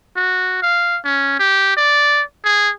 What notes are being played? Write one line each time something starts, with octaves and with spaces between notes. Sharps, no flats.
F#4
F5
C#4
G4
D5
G#4